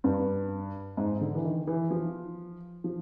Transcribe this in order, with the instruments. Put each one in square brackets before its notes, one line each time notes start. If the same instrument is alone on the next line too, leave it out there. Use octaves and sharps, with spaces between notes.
[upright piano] G2
G#2
D3
E3
D#3
E3
F3
F3